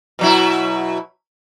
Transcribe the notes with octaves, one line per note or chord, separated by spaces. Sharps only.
B2 F#3 E4